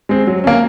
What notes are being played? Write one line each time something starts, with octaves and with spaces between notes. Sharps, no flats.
G#3 C4
F#3
A#3 C#4